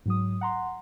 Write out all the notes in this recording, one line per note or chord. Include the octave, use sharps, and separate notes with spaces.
G#2 F#3 D#6
F#5 A#5 C6